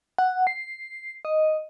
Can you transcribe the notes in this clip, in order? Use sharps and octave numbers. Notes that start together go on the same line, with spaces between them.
F#5
C7
D#5